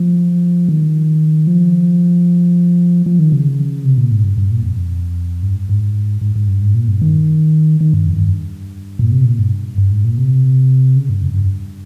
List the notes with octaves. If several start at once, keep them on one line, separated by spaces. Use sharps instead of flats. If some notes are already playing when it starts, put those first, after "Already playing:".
Already playing: F3
D#3
F3
F3
D#3
C#3
C3
A#2
G#2
G2
G2
A#2
F2
G2
G#2
G#2
G#2
G2
G#2
A#2
G2
D#3
D#3
G2
F2
G2
A#2
C3
A#2
G2
G2
G#2
A#2
C3
C#3
G2
F2
G2